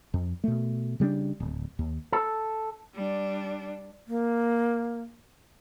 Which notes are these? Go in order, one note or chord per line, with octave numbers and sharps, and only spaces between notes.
F2
B2 A3
C#3 G3 B3 D4
D1
D#2
A4
G3 D4
A#3